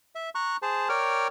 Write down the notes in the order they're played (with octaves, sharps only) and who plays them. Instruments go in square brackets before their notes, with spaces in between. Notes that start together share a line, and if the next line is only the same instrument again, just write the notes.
[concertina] E5
A#5 C#6 F#6
G#4 C5 A5
A#4 C#5 D5 G5 F6